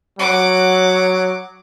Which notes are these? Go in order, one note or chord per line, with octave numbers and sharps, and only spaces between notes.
F#3 F#5 D6